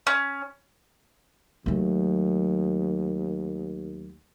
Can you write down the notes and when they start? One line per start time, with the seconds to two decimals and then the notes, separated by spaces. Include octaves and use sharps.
0.07 C#4
1.66 D#2 F#3 A3